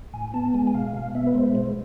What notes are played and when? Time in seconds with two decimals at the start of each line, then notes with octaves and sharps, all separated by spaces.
0.13 A2 G#5
0.34 B3 A5
0.54 G#3 G#5
0.67 G#5
0.74 B2 F5
0.94 B2 F5
1.15 B3 E5
1.27 B4
1.35 G#3 C5
1.55 B2 C5